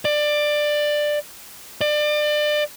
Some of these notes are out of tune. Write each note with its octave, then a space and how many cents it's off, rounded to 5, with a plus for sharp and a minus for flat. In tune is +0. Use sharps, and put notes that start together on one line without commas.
D5 +15
D5 +30